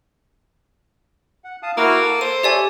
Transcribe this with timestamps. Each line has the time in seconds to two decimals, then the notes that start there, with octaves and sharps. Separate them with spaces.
1.44 F#5
1.63 F5 A5 D#6
1.77 A#3 E4 F#4 F6
2.02 A4
2.21 C5 D#7
2.43 G4 A4 C#5 D5 E5 G#5